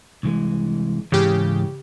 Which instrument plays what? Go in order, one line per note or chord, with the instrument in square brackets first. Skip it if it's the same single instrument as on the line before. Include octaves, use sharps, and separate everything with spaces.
[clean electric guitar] C2 E3 G#3
[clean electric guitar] G#2 E3 [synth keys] C#3 G4